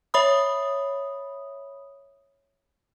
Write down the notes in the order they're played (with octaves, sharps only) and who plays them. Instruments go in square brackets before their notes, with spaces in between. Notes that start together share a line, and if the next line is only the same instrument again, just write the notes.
[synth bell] C#5 E5 B5 D#6